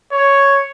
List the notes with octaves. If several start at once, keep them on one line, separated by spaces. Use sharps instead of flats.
C#5